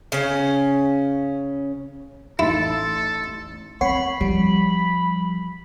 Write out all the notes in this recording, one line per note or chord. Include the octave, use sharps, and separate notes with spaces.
C#3 C#4
A1 D#4 E4 A4 C6
C4 C#5 F#5 B5 C7
F3 G3